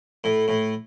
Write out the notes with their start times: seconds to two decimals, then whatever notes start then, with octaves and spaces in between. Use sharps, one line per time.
0.24 A2
0.48 A2